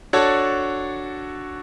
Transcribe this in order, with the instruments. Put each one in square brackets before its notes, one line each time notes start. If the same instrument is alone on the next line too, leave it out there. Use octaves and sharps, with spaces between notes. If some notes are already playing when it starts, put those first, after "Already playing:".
[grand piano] D4 F#4 A4 C#5